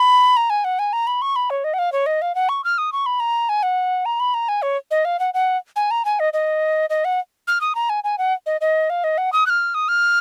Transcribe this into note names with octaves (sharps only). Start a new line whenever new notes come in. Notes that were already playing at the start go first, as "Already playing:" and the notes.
Already playing: B5
A#5
G#5
F#5
G#5
A#5
B5
C#6
B5
C#5
D#5
F#5
F5
C#5
D#5
F5
F#5
C#6
F6
D#6
C#6
B5
A#5
G#5
F#5
A#5
B5
A#5
G#5
C#5
D#5
F5
F#5
F#5
G#5
A#5
G#5
D#5
D#5
D#5
F#5
F6
D#6
A#5
G#5
G#5
F#5
D#5
D#5
F5
D#5
F#5
D#6
F#6
F6
D#6
F6